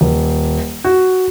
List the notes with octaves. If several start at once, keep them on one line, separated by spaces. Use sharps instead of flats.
D#1
F#4